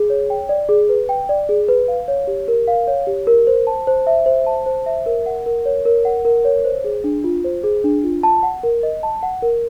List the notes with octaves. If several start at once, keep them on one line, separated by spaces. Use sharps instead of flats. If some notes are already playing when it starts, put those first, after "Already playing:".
Already playing: G#4
C#5
G5
D5
G#4
B4
G5
D5
G#4
B4
F5
C#5
G4
A#4
F5
C#5
G4
A#4
C5
A5
C5
E5
C5
A5
C5
E5
A#4
F#5
A#4
C#5
A#4
F#5
A#4
C#5
C5
G#4
D4
F4
C5
G#4
D4
F4
A5
F#5
A#4
D#5
A5
F#5
A#4